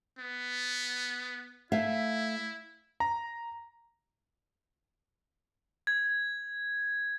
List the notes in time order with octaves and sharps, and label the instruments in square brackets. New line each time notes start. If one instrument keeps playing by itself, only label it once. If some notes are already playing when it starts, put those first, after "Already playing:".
[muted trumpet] B3
[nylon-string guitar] A3 E5 F5 [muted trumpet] E4
[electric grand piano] A#5
[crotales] G#6